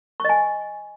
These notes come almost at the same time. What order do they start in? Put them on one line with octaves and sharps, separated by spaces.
C#6 D#5 G#5